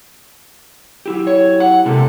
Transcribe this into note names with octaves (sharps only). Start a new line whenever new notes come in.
F#3 E4 G4
C#5
F#5
C3 G#3 A#3 A4